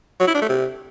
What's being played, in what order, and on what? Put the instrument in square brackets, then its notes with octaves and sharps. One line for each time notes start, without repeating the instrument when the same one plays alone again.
[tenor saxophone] F#3
E4
D4
A3
C3